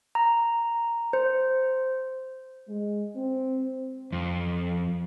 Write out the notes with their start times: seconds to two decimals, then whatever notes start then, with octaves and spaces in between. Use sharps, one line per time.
0.15 A#5
1.13 C5
2.68 G#3
3.15 C4
4.12 F2